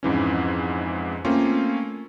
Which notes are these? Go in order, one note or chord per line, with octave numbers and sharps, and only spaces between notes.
F2 G#2 E3 C#4
A3 A#3 C4 C#4 F4